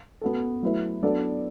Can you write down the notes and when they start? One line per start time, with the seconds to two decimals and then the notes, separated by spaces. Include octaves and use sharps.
0.21 B3 F#4 A4
0.63 F#3 A3 E4 B4
1.02 F#3 B3 D4 A4 D5